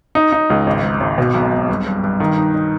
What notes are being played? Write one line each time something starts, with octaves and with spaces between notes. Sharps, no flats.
D#4
D#4
C#2
G#1
G#2
G#1
B2
B1
B1
G2
G2
G2
D#3
D#4
D#4